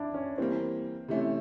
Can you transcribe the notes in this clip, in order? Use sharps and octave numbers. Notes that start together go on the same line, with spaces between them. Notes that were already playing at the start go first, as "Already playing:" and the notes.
Already playing: D4 E4
C#4
E3 G3 A#3 C4
C3 E3 A3 C#4